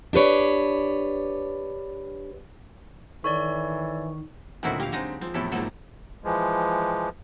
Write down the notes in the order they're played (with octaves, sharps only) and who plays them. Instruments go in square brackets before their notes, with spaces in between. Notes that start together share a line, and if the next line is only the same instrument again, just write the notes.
[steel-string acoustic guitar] D4 G4 B4 C#5
[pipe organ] D#3 [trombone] E3 [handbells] A4 C#5 D5 [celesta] C#6
[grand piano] D2 A#2 [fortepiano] D#3 A3 C4 [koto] F#3 E4 F#4
[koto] A#3 F5 [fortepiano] G4
[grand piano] D3 C4 [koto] F#3 G#3 D#4
[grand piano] F3 [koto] C4
[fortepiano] E2 A2 C3 [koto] E4 A4
[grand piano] G#2 F3 A#3 [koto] F#3 A4
[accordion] E3 F3 G#3